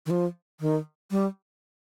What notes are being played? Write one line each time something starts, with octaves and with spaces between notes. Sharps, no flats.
D#3
F3
D#3
G3